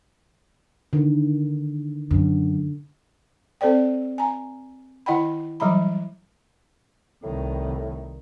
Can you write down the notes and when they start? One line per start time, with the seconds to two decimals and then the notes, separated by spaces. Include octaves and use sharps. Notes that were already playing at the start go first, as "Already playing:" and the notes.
0.93 D3 D#3
2.11 F#2 D3
3.61 C4 A4 C5 D5 G5
4.18 G#5 A#5
5.06 D#3 E4 D#5 F#5 G5 B5
5.60 E3 F#3 G3 A#5 B5
7.23 C2 A2 D#3